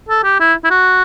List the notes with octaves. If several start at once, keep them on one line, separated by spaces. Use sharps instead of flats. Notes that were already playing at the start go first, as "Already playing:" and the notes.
A4
G4
E4
E4
F#4